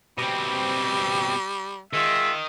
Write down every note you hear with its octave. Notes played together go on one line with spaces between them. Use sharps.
B2 G3 C4
D#3 G#3 F4 E5